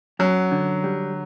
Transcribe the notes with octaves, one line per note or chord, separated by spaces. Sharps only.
F#2 F#3
D3
G3